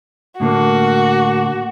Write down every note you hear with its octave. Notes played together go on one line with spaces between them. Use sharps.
A2 D3 A#3 F#4